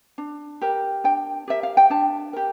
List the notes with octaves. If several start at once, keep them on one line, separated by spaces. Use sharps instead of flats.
D4
G4 A#4
D4 G5
G4 A#4 E5
F5
G5
D4 A5
G4 A#4